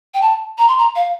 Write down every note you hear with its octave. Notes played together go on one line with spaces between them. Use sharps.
G5
A5
A#5
C6
A#5
F5